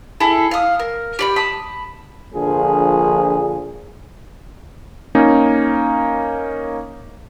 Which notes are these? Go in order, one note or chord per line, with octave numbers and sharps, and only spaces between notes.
E4 G#4 A4 E5
F5 D#6
A#4
G4 D5 B5
A5 B5 D#6
A#1 D3 F3 G#4
A#3 C#4 D#4